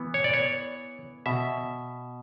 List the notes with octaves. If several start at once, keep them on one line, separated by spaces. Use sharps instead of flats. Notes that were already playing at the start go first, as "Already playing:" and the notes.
Already playing: E3 B3
C#5
D5
C#5
B2 E5